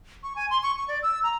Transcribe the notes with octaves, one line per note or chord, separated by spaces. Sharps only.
C#6
G#5
C6
C#6
C#6
D5
E6
A#5